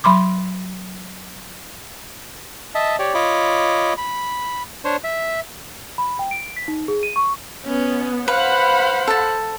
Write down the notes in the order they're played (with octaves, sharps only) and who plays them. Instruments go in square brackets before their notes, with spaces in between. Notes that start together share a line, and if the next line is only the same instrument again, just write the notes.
[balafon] F#3 B5 C6 D6
[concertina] D#5 E5 A5
G4 C#5 D5
F4 C#5 D#5 B5 D6
B5
D4 C5 C#5
E5
[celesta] B5
G5
D7
B6
D#4
G#4
D#7
C#6
[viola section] B3 [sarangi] C#4
[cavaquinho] B4 [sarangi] C5 [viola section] F5 F#5 B5
[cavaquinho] A4 A5